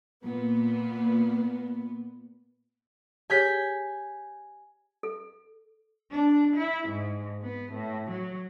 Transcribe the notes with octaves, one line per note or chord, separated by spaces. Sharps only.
A#2 B3
G4 G#4 C#5 G#5 G6 B6
A4
D4
E4
G#2
B3
A2
F#3